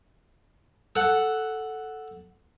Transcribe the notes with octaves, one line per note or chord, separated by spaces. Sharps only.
A4 F#5